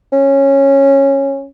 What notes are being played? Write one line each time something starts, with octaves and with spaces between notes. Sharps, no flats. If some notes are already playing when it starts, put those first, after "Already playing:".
C#4